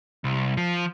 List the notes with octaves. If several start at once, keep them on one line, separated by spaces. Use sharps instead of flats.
C2
F3